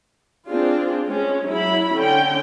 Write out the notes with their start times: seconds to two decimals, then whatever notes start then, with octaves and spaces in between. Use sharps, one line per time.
0.47 C4 D4 F4 G#4
1.08 G#3 C#4
1.49 F#3 E4 B5
1.96 D3 C#4 G5